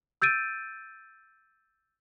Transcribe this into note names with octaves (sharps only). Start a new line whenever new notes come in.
E6 G6 A6 D7 D#7